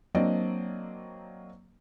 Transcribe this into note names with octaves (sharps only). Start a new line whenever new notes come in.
F#3 A#3 C4 D4 D5 D#5